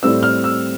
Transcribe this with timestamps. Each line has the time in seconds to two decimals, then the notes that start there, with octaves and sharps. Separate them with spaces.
0.03 A2 G3 C4 E6
0.23 F6
0.44 E6